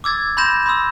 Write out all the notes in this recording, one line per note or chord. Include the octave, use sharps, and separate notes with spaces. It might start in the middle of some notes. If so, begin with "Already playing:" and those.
D6 E6 G#6 A6
B5 C6 G6 A#6 E7
B5 C6 D#6 E6